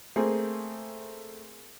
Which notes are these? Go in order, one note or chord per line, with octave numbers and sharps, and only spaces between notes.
A3 A#3 C4 G#4